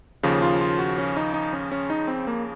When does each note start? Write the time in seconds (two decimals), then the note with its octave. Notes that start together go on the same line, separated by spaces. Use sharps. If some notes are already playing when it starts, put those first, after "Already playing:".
0.23 D#2 C#3 F3
0.42 F4
0.61 F4
0.79 F#4
0.98 C#4
1.17 D#4
1.34 D#4
1.53 C#4
1.72 C#4
1.90 D#4
2.08 C4
2.27 A#3